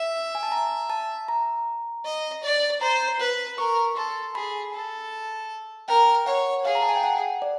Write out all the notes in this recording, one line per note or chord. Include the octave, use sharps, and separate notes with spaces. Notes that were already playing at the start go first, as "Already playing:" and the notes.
Already playing: E5
G#5
A5
A#5
A5
A#5
D#5
D5
C5 A#5
B4
A#4 C#6
A4 C6
G#4 B5
A4
A#4 G5
C#5 F#5
G#4 F5
A#5
A5
G#5
G5
F#5
D5